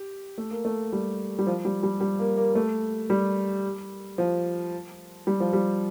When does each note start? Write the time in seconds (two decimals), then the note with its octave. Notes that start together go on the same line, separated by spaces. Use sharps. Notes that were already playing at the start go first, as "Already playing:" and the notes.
Already playing: G4
0.38 A3
0.51 A#3
0.65 A3
0.92 G3
1.39 G3
1.47 F3
1.65 G3
1.83 G3
2.00 G3
2.19 A#3
2.37 A#3
2.55 A3
3.10 G3
4.18 F3
5.27 G3
5.40 F3
5.53 G3